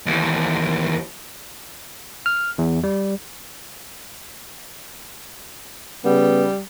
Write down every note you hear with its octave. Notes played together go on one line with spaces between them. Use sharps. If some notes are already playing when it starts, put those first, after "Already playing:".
D#2 E3
F6
E2
G3
C#3 G3 B3